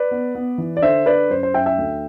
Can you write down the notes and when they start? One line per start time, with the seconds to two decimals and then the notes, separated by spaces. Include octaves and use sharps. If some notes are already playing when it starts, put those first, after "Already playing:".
Already playing: B4 D5
0.11 B3
0.35 B3
0.58 E3
0.77 D5
0.83 D3 C5 E5
1.06 D3 B4 D5
1.30 F#2 C5
1.43 C5
1.54 F#2 E5 G5
1.66 E5 G5
1.78 D2